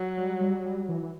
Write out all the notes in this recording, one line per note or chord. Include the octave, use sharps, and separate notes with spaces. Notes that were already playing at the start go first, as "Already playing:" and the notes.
Already playing: F#3
G3
G3
G3
E3
E3